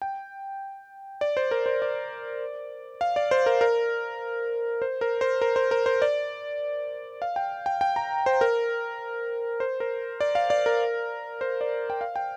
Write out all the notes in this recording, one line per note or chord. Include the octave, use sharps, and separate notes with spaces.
G5
D5
C5
A#4
C5
D5
F5
D5
C5
A#4
A#4
C5
A#4
C5
A#4
C5
A#4
C5
D5
F5
G5
G5
G5
A#5
C5
A#4
C5
A#4
D5
F5
D5
A#4
C5
D5
G5
F5
G5